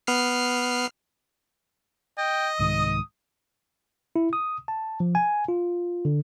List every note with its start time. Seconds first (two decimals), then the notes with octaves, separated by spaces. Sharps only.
0.07 B3 F6 C7
2.18 D#5 G5
2.59 C2 G#2 D#3 D#6
4.16 E4
4.33 D#6
4.68 A5
5.00 F3
5.15 G#5
5.48 F4
6.05 D3